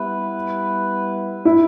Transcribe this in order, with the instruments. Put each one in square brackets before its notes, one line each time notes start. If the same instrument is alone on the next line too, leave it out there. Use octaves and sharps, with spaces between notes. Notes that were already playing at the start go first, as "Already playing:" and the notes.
Already playing: [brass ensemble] G3 B3 E4 B4
[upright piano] E4